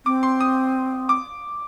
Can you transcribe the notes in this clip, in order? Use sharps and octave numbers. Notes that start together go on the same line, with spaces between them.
C4 D6
C6
D#6
D6